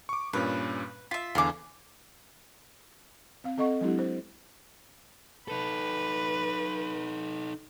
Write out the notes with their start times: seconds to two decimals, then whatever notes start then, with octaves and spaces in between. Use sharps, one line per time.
0.09 C#6 D6
0.33 G2 A#2 C#4 B4
1.11 F4 E5 B6
1.35 E2 D3 F5 G#5 D6
3.44 C4 F5
3.58 C4 A4 D#5 F#5 C#6
3.81 F#3 G#3 C4 D4 E4 G4
3.99 C5
5.48 D#4 A4 B4